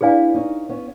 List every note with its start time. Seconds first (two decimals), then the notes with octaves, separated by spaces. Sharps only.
0.01 D4 E4 G#4 B4 D5 F5 G#5
0.35 C#4 D#4
0.69 B3 C#4